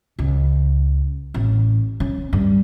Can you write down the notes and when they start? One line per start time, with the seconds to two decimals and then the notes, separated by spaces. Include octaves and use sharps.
0.19 C#2
1.34 A1
2.00 C#4
2.33 G2